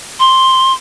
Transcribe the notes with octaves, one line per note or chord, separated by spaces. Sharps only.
C6